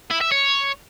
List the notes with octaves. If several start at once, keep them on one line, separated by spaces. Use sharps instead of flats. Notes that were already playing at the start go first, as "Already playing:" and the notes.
E4
E5
C#5